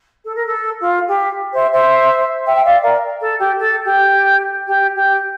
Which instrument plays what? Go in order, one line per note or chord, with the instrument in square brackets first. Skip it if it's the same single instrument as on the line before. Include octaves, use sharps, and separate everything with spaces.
[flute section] A4
A#4
A4
F4
G4
C5 E5
C5 E5
E5 G5
G5
D5 F5
A#4 D5
A4
G4
A4
G4
G4
G4